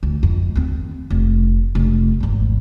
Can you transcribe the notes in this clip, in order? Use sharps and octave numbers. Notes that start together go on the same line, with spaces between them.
D2
F2
D#2 C4
F1
F1
G#1 E2